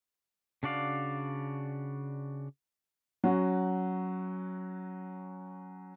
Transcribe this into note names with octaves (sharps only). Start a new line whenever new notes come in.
C#3 D4 F#4 D5 F5
F#3 C#4 F#4